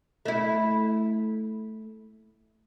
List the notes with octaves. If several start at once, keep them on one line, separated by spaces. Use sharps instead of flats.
A3 E4